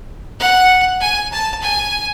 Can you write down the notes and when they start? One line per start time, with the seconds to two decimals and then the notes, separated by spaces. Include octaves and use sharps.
0.40 F#5
1.01 G#5
1.32 A5
1.62 G#5